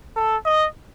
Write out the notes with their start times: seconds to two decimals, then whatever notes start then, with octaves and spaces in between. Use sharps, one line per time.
0.16 A4
0.46 D#5